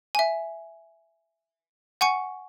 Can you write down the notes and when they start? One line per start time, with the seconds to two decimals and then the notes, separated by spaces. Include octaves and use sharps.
0.15 E5 G#5
2.01 F#5 G#5 C#6 C#7